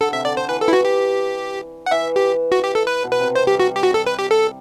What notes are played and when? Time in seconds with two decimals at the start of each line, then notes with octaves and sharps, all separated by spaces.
0.01 D3 A4
0.12 C3 E5
0.25 D3 D5
0.36 D3 C5
0.48 E3 B4
0.61 A4
0.68 E4
0.73 F#4
0.85 G4
1.86 F#5
1.91 E3 E5
2.16 G4
2.52 F#4
2.64 G4
2.75 A4
2.87 B4
3.04 B2
3.11 B4
3.20 C3
3.36 C3 C5
3.47 G3 G4
3.60 F#4
3.72 G3 G4
3.83 F#4
3.94 A4
4.07 B4
4.19 G4
4.31 A4